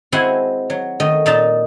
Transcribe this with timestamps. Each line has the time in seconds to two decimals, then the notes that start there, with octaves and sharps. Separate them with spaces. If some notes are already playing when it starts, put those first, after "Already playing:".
0.12 G#3 C4 E4 F#4 F#5 G#5
0.70 F#3
1.00 D#3 A3 D#5
1.26 A#2 D#4 A5